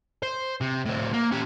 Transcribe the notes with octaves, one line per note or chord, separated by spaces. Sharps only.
C5
C3
A2 C4
A#3
C#4 G4